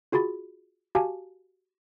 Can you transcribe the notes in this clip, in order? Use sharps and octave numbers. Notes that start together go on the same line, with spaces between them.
F4 F#4 G#4 B5 A6
F#4 G4 F5 G#5 A5